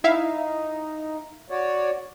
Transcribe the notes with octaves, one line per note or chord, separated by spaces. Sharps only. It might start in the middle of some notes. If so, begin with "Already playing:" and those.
D#4 E4 E5 F5
F#4 C#5 D5